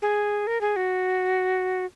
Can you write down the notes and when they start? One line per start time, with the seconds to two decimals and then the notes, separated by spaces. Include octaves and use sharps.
0.02 G#4
0.47 A#4
0.61 G#4
0.76 F#4